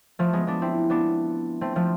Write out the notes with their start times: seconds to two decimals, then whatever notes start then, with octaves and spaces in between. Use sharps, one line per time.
0.19 F3 A3
0.33 G#3 B3
0.47 B3 D4
0.62 C4 E4
0.90 B3 D4
1.61 A3 C4
1.76 F3 A3